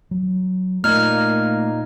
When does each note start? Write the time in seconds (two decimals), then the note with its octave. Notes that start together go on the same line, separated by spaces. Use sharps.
0.11 F#3
0.84 A#2 A3 A#3 D#4 F6 G#6